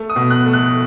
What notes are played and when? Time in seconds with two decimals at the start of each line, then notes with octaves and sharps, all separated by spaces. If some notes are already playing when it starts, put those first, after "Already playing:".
Already playing: A3
0.10 D#6
0.16 B2
0.30 F#6
0.46 A3
0.53 F#6